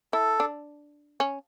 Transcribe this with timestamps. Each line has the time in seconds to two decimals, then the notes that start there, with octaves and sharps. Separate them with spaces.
0.13 E4 A4
0.40 D4
1.20 C#4